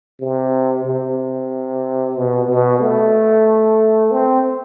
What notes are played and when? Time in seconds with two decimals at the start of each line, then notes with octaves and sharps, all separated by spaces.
0.20 C3
0.85 C3
2.16 B2
2.49 B2
2.81 A3
4.11 C4